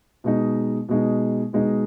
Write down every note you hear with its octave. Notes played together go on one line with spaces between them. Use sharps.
B2 G#3 D#4
B2 G#3 D#4
B2 G#3 D#4